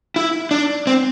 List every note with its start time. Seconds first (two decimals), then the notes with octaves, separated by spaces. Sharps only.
0.16 E4
0.51 D4
0.87 C4